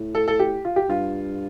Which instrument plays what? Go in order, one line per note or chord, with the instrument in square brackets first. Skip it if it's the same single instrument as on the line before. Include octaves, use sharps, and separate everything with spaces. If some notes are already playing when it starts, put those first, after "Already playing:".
Already playing: [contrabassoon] A2
[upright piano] A4
A4
G4
F4
G4
[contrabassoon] G2 [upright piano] F4